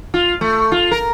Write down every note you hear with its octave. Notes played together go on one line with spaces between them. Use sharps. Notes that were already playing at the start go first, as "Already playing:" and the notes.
F4
A3
F4
A#4